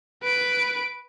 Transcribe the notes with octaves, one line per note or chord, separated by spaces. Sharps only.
B4 D7